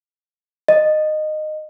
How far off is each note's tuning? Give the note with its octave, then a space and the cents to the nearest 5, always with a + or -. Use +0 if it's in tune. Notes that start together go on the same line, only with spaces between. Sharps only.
D#5 -15